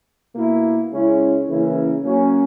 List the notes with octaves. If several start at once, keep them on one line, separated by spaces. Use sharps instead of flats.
B2 A#3 E4
C#3 G#3 C#4 E4
C#3 E3 A#3 C#4 E4
F#3 A#3 C#4